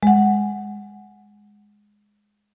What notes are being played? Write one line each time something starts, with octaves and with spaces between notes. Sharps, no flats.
G#3 F#5